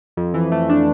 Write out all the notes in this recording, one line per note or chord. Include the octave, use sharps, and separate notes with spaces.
F2
E3
A3
D4